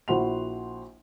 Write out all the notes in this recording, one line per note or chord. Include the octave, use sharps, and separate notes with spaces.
A#1 E4 F#4 F#5 C6 F7